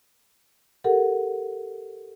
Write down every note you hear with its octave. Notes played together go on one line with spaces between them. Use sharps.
G4 A4 A#4 F#5